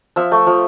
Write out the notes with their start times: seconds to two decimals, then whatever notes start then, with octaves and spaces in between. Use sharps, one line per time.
0.16 F3 E5
0.32 A3
0.47 F3